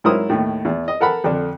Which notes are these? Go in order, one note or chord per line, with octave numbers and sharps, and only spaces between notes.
G#2 F#3 E4 A#4 C5 D#6
D#2 A2
E2
D#5
A4 A#4 F#5 A5 B5
F2 D3 D4